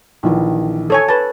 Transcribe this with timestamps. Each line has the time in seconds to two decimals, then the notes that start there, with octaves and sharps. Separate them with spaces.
0.23 A#1 D#3 E3
0.90 A4 C#5 G#5
1.09 B4 A5